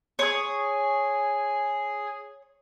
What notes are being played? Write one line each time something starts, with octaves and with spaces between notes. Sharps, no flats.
G#4 C#5 C#6 D#6